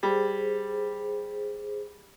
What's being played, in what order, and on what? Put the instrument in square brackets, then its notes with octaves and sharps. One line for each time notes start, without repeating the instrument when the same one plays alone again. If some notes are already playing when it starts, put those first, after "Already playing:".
[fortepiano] G3 [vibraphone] G#4 C5